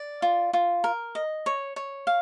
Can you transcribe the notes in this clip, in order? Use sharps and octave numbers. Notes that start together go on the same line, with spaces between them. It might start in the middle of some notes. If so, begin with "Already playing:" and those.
Already playing: D5
F4
F4
A#4
D#5
C#5
C#5
F5